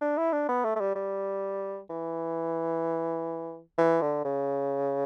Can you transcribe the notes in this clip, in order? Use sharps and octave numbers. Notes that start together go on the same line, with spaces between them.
D4
E4
D4
B3
A3
A3
G3
G3
E3
E3
D3
C#3